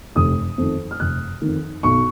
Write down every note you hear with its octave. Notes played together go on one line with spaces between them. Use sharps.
F1 D#6
F2 D#3
F6
F1 F#6
F2 D#3
B1 C#6